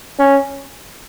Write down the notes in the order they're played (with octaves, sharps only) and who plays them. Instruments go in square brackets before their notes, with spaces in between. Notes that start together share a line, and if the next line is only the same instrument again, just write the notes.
[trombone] C#4